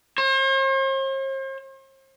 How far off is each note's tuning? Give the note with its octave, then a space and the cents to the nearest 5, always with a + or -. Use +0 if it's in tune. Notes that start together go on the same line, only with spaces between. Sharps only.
C5 +45